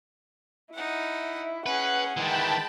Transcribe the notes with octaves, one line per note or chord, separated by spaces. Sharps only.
D#4 E4 F#5
C#4 G#4 B4 F#5
D#3 E3 G#3 G5 A5 B5